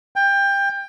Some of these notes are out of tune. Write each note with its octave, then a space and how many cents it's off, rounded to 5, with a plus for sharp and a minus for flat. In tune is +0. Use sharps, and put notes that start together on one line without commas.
G5 +20